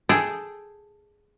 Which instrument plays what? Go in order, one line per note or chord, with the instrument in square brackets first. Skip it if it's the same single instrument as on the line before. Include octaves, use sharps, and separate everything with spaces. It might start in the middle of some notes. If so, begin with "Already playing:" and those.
[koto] G#4 A4 G5